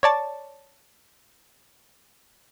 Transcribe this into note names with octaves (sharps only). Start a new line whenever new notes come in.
C#5 D5 A5